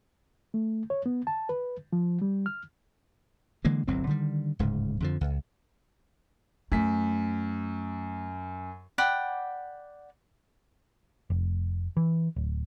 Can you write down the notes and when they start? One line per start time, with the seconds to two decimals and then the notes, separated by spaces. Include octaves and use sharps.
0.54 A3
0.90 C#5
1.06 B3
1.27 A5
1.49 B4
1.93 F3
2.22 G3
2.46 F6
3.65 D3 E3 G#3 A#3
3.88 G1 C2 F#3 C4
4.07 D3 D#3 G3
4.59 D1 G#2 C#3
5.00 F2 D3 F3
5.21 C#2
6.72 F#2 A3 B6
8.98 D5 F#5 G5 B5
11.30 F1
11.97 E3
12.36 D1